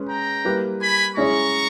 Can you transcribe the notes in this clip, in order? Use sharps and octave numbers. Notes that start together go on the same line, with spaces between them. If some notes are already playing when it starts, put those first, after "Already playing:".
Already playing: G#3 C#4 G#4 B4
G5 A#5
G3 A#3 E4 G4 B4
G#5 B5
G#3 C#4 E4 G#4 C#5 A#5 C#6